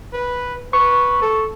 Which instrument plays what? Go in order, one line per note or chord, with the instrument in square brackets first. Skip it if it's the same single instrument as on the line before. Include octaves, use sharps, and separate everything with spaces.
[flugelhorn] B4
[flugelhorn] B4 [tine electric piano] C#6
[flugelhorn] A4